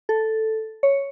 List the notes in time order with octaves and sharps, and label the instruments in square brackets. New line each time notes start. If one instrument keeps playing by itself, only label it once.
[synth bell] A4
C#5